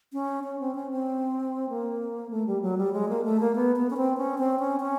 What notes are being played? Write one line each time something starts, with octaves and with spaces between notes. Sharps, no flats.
C#4
C#4
C4
C#4
C4
A#3
A3
G3
F#3
G3
G#3
A#3
A3
A#3
B3
B3
C#4
C4
C#4
C4
C#4
C#4